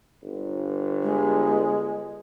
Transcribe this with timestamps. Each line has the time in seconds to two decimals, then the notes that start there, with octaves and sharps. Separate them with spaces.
0.23 G1
1.02 G#3